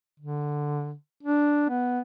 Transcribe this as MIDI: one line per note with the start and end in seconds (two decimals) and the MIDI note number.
0.20 0.94 50
1.23 1.67 62
1.69 2.00 59